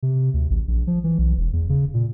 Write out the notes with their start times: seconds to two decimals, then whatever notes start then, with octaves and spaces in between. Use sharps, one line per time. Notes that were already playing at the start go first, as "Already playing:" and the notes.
0.03 C3
0.34 D2
0.50 A1
0.68 A#1
0.87 F3
1.04 E3
1.19 B1
1.37 E1
1.53 E2
1.69 C#3
1.94 A#2